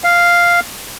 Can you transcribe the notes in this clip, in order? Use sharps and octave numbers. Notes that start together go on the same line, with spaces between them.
F5